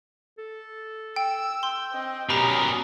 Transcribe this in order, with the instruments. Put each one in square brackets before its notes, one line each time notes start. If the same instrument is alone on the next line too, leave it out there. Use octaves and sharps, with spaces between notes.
[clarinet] A4
[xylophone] G5 [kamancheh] E6
[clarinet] G5 [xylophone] C6
[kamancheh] C4 D#5
[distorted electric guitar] B2 A#4 [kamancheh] C#4 D#6 [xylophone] G4 A#5